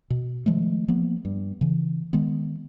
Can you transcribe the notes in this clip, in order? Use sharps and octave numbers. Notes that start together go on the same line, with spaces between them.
B2
D#3 F3 G#3 A3
F3 A#3 B3
G2
C#3 E3
D#3 G#3 B3